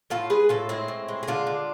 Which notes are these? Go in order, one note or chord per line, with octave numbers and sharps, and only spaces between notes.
A2 F4 A4
G#3 G#4 B4
A2 F4 A4
G#3 C4 E4
A2
G#3
G#4
D3 D4 F4
D3